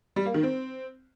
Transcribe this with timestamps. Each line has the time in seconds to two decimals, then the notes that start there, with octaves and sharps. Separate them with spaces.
0.16 G3
0.25 A#3
0.34 D#3
0.43 C4